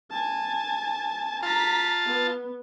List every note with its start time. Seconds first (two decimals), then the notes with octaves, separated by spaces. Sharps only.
0.10 G#5 A5
1.43 F4 A5 A#5 B6
2.06 B3